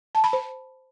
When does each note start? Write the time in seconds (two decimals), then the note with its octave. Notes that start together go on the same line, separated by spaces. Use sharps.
0.15 A5
0.24 B5
0.33 C5